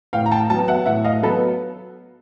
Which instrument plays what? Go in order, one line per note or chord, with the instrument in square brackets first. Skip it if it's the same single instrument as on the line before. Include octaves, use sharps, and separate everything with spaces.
[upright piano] A2 F5 G5
A#5
G5 A5
F#3 B3 G5 A5
E5 F#5
A2 E5 F#5
D#5 F5
F#3 B3 A4 B4